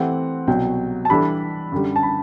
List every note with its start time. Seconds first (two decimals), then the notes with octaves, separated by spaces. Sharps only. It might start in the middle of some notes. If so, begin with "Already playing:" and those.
Already playing: E3 A3 C4 G4 F#5
0.47 C2 B2 F#3 G5
1.05 A5
1.09 E3 G3 D4 A4 B5
1.72 F#2 D3 G3
1.96 A5
2.03 B5